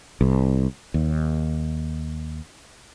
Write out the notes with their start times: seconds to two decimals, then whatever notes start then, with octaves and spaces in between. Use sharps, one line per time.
0.21 C2
0.94 D#2